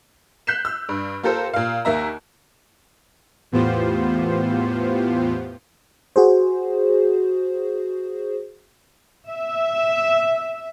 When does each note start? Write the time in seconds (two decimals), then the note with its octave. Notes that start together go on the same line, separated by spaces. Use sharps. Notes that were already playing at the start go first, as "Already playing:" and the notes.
0.47 F#6 G6 B6 C7 E7
0.65 E6
0.89 G2
1.23 A#3 F4 G4 A4 A#4 C5
1.54 A#2 F5
1.85 D#2 A#3 E5 A#5
3.52 E2 A2 B3 F4 G4 C5
6.16 F#4 G#4 C5
9.30 E5